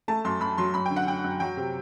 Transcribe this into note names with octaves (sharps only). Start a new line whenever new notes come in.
A3 A5
F#2 C6
F#2 B5
F#3 C6
F#2 B5
G5
D3
F#5
D3 G5
F#2
F#3 G5
C3